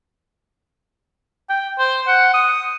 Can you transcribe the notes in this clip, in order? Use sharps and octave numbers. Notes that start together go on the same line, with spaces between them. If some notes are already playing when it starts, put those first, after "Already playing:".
G5
C5
F#5
D#6